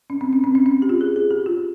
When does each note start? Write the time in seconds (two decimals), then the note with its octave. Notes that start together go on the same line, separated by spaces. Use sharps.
0.10 C#4
0.21 C4
0.33 C#4
0.44 C4
0.55 C#4
0.66 C#4
0.82 G4
0.89 F4
1.01 G#4
1.16 G#4
1.31 G4
1.46 F4